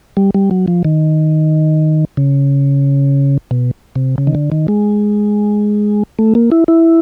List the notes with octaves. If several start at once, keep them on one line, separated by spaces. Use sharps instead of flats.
G3
G3
F#3
F3
D#3
C#3
B2
C3
C#3
D#3
D3
D#3
G#3
A3
A#3
E4
E4